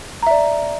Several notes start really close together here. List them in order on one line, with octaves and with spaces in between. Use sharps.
A#5 E5 D5